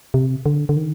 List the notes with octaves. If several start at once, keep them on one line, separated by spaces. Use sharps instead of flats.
C3
D3
D3
D#3